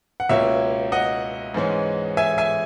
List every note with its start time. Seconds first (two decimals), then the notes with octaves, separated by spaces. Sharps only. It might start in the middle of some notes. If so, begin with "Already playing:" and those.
0.20 F#5
0.29 C#2 B2 A#3 C#4 C#5 E5
0.92 D#5 F#5
1.54 G#2 E3 G#3 C#4
2.17 E5 G#5
2.38 E5 G#5